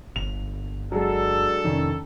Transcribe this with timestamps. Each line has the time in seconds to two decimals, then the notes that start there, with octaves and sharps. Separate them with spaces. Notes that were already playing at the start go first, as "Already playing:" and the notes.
0.16 G1 F7
0.92 F#3 G#3 D4 A4
1.64 F2 C3 D#3 F3 C#4